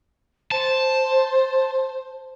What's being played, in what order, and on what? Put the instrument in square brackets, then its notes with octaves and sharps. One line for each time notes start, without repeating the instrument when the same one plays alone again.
[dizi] C5 [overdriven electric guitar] A5